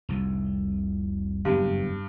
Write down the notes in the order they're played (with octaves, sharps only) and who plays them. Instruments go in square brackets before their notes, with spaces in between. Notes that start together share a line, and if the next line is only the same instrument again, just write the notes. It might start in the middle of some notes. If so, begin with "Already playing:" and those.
[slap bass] F1 C2 F2
[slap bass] F#1 E2 B3 [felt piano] G2